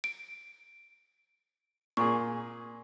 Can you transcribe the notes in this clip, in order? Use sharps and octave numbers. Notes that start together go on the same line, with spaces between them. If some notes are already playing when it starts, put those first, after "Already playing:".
D7
A#2 G#4 C#6